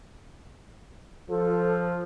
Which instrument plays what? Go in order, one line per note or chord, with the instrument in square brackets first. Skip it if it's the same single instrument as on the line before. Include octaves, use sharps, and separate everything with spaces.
[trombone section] F3 [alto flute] A4